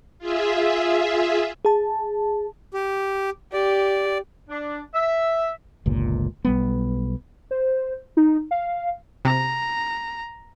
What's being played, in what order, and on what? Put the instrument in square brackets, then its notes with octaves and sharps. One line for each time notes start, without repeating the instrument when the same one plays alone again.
[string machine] F4 G#4 E5
[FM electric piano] G#4 A5
[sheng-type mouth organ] G4
[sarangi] G4 [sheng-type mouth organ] D5
[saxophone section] D4
E5
[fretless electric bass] G1 C#2 A#2
B1 G3 B3
[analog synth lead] C5
D#4
F5
[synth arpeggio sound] C3 [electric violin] A#5